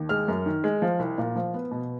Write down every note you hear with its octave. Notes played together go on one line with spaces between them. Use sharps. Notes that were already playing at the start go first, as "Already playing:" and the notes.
Already playing: D#2
G#3 F6
F#2
D#3
G#3
F3
C2
A#2
F3
B3
B2